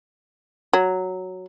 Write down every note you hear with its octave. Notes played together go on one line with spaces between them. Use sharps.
F#3